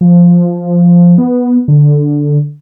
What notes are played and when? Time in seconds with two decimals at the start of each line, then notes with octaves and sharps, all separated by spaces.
0.01 F3
1.18 B3
1.68 D3